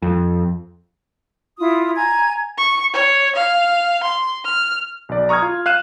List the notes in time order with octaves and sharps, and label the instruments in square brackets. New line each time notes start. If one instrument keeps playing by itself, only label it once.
[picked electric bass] F2
[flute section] E4 F4 D#6
G#5 A#5 G#6
[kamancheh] C#6
C#5
F5
C6
F6
[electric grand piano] B1 D5
A#5 C#6 D#6 F6 G#6
F4
F5 F#6 D#7 E7